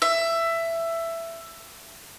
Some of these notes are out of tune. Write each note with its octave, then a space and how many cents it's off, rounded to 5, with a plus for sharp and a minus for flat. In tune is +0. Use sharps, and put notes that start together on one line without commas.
E5 +15